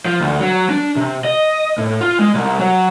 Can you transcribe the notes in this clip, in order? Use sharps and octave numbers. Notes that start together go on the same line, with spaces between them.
F3
D2
F#3
D4
C3
D#5
A2
F4
G#3
C2
F#3